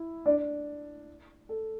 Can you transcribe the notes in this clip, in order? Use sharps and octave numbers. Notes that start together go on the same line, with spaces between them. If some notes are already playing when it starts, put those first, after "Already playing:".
Already playing: E4
D4 D5
A4